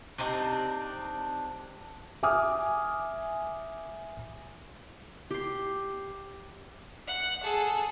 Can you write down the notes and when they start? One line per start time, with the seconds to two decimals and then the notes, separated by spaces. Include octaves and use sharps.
0.18 C3 C4 D4 D#4
2.23 E5 G#5 D6 D#6 F6
5.31 G4 C6
7.07 F#5
7.43 G#4 A4